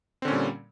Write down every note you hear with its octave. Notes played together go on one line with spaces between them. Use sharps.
A#2 D3 G3 C4 C#4